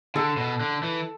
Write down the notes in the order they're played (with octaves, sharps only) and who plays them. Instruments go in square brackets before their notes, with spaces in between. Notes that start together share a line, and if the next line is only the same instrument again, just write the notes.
[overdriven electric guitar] D3 [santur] A4
[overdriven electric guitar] B2
D3
E3